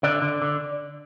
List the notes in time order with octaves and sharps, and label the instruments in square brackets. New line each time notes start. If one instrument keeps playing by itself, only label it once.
[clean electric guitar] D3 D5
D3
D3